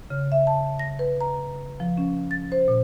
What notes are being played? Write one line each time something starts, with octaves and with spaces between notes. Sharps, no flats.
C#3
E5
A5
A#6
B4
A#5
F3
C#4
A6
C5
A#2